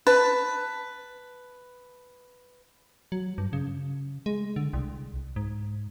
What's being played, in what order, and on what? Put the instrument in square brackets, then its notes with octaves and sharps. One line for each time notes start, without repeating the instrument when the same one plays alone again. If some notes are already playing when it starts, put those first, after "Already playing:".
[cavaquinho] B4 A5
[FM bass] F#3
G2
C#3
G#3
D3
C2
G#2